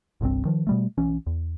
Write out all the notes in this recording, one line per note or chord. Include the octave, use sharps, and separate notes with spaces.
G1 C2 G2 C4
D#3 F3
B2 G3 A3
B1 E3 C#4
E2